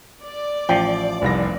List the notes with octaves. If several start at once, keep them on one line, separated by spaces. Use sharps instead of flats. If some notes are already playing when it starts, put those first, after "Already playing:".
D5
A1 F3 G5 C7
F1 C2 A#6